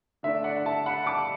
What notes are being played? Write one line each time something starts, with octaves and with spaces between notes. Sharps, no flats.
D3 A3 D4 E5
D5 F#5
F#5
E5 A5
F#5 B5
A5 D6